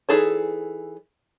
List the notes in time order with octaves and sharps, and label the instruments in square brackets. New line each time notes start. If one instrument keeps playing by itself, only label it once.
[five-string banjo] E3 D#4 G#4 A4 C#5